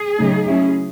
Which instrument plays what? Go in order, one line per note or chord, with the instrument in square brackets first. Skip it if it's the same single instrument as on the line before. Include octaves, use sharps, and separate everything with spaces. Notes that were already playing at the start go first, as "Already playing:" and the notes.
Already playing: [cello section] G#4
C#3 F#3 A3 D#4
F#3 C#4 E4